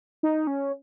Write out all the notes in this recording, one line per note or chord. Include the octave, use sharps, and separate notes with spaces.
D#4
C#4